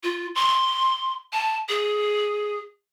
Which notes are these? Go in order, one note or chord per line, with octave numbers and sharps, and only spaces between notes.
F4
C6
A5
G#4